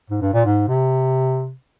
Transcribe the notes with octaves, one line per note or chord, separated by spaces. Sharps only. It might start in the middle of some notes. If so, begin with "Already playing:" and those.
G#2
G2
A#2
G#2
C3